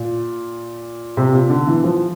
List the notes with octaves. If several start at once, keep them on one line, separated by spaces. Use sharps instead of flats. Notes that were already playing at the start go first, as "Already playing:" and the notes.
Already playing: A#2
C3
A#2
D3
E3
F3